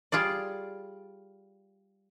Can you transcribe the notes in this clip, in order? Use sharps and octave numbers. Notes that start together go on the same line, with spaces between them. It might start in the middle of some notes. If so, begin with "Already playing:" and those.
G3 F4 G#4 D5